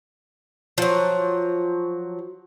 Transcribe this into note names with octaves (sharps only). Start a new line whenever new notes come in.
F3 F#3